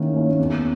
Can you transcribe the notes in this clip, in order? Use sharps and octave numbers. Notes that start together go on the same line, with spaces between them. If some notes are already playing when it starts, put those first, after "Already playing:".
Already playing: D#3 A#3 C#4 E4
A#3 C#4 E4
E2